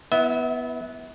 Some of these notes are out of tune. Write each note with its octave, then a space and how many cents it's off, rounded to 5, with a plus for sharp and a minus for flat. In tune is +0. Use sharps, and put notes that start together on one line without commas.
B3 -5 E4 +0 E5 -40